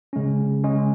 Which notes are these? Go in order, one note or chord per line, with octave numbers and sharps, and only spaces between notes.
C#3 G#3 C#4
C#3 G#3 C#4